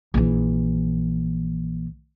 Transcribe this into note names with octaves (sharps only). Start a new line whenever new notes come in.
A#1 E3